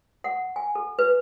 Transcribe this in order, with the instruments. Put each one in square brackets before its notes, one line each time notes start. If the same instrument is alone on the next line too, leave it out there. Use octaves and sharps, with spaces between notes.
[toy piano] F#5
G#5
A4
B4